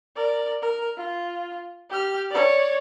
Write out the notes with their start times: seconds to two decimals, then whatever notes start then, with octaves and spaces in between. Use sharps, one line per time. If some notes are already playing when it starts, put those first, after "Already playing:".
0.17 A#4 D5
0.62 A#4
0.97 F4
1.90 G4 F6
2.31 C#5 D5